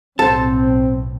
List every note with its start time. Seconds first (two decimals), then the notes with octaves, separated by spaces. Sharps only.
0.19 B1 A2 C4 A4 C5 A5